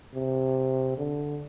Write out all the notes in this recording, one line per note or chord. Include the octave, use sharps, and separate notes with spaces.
C3
D3